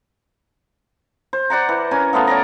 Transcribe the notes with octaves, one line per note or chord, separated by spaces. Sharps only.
C5
C5 D5 F#5 A#5
E3
C#4 A#4 G#5
F3 A3 B3 F5
C#5 D5 F5 A#5